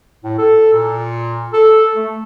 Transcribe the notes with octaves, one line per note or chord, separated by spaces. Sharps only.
A2
A4
A#2
A4
A3